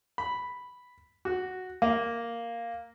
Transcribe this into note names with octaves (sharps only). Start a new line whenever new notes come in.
B5
F#4
A#3